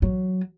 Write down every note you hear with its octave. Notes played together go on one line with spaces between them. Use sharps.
F#3